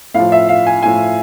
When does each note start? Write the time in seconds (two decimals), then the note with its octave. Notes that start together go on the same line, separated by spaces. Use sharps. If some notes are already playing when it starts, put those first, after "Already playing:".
0.14 A2 F3 F5
0.32 E5
0.49 F5
0.67 G#5
0.83 A2 F3 G#5